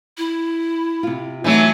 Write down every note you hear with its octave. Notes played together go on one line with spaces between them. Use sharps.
E4
C3 F4
E3 F#3 A3 C4 D#4